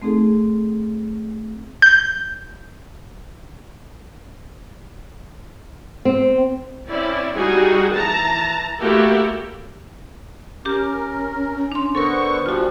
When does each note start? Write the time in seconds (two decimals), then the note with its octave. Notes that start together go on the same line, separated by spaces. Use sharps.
0.02 A3 C4 D#4 G#4 A4
1.82 G6
6.05 C4
6.88 C4 C#4 E4 D5
7.35 G3 D#4 F#4 G#4
7.94 E3 A5 A#5
8.80 A3 A#3 E4 F#4 G4 A4
10.65 C#4 G4 A#4 D6
11.72 D4 C6
11.95 D3 B3 A4 A#4 C5 C#6
12.46 A#2 F3 G3 F4 F#4